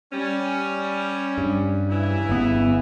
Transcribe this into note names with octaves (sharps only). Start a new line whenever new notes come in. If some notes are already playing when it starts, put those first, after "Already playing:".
G3 C#4
G2
C#3 E3 E4
G1 B3